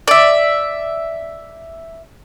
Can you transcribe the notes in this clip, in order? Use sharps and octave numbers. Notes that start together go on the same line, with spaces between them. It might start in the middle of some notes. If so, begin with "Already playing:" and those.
D5 E5